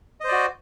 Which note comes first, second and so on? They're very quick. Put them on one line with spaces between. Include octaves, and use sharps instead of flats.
D#5 C5 D5 F#4